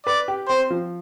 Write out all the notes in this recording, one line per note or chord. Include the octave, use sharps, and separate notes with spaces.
B4 D5
G4
C4 C5
F3